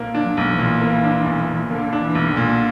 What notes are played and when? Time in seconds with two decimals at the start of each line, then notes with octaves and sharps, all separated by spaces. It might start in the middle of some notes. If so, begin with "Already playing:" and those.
Already playing: B1 A#2 A#3
0.15 D4
0.22 F#3
0.37 B1
0.52 E3
0.59 A#2
0.82 A#3
1.04 D4
1.26 B1
1.48 A#2
1.70 D3 A#3
1.93 D4
2.00 E3
2.15 B1
2.29 D3
2.37 A#2